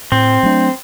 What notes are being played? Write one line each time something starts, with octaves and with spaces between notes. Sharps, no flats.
A2 C4
F#3 A3 D4